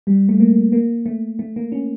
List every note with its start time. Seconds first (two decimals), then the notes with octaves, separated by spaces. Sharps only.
0.07 G3
0.29 A3
0.40 A#3
0.72 A#3
1.06 A3
1.39 A3
1.56 A#3
1.72 C#4